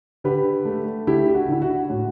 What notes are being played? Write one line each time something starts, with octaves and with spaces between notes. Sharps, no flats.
D3 G4 B4
A3
D3 E4 G4
G4
F#4
D3 E4
F#4
A2 F#4